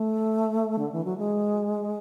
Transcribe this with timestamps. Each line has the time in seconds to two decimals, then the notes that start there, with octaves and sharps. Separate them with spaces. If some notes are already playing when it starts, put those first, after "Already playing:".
Already playing: A3
0.79 D3
0.92 E3
1.05 F#3
1.18 G#3